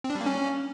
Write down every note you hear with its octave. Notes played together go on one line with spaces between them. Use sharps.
C4
D4
G3
A#3
C#4